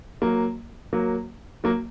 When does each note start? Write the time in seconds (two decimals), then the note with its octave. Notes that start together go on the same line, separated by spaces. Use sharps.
0.22 F#3 A#3
0.93 F#3 A#3
1.64 F#3 A#3